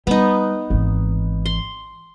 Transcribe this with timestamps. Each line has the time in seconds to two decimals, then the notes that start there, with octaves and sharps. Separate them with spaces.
0.07 G3 B3 D#4
0.70 G#1 E3
1.46 C6